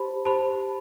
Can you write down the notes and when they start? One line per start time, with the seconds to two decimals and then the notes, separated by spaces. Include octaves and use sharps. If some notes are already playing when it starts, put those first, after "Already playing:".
Already playing: G4 C5 A5 B5
0.25 G4 C5 A5 B5